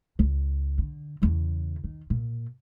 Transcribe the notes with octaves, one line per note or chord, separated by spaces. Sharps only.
C#2
D3
E2 C#3
D#3
A#2